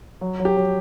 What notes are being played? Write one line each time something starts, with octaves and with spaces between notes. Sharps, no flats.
F#3
F#3
G4
F#3